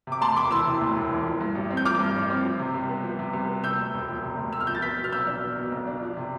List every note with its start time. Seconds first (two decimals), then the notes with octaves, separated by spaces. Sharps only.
0.07 C3 D6
0.21 D2 A5 C6
0.36 E1 B5 D6
0.51 E3 C6 E6
0.66 C3
0.81 D2
0.96 E1
1.11 E3
1.25 F3
1.41 G2
1.55 A1
1.70 C4
1.77 G6
1.85 F3 D6 F6
2.00 G2
2.15 A1
2.30 C4
2.44 F3
2.59 C3
2.74 C2
2.89 B3
3.04 F3
3.19 C3
3.33 C2
3.48 B3
3.63 C3 E6 G6
3.78 D2
3.94 E1
4.08 F3
4.23 C3
4.37 D2
4.53 E1 E6
4.60 F6
4.67 F3 G6
4.75 A6
4.82 B3 G6 B6
4.97 B2
5.04 F6
5.12 B1 E6 G6
5.27 D4
5.42 B3
5.56 B2
5.72 B1
5.87 D4
6.01 F3
6.17 C3